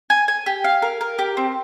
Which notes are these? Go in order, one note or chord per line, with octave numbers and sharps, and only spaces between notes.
G#5
G#5
G4
F5
A#4
A#4
G4
C4